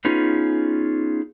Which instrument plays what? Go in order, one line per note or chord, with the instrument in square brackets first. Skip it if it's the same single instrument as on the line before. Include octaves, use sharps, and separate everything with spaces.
[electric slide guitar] B3 C#4 D#4 F4 G#4 B4